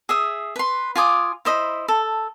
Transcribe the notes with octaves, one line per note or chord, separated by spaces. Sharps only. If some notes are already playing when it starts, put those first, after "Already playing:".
G#4 E5 D#6
B4 C6
F4 G#5 D6 D#6
E4 C5 D#5 B5
A4